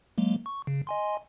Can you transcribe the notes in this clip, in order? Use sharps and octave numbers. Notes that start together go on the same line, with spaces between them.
F#3 G#3 A#3
C#6
C#3
D#5 G#5 C6